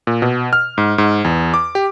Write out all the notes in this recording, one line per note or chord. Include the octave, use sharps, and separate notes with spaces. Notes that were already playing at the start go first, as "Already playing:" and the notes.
A#2
B2
F6
G#2
G#2
E2
D6
G4